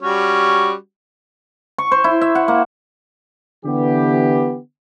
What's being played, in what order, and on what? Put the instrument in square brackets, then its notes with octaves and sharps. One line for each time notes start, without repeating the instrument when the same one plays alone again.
[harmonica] G3 C#4 F#4
[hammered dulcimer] C#6
C5
E4
E5
F#5
A#3
[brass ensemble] D3 E3 B3 G4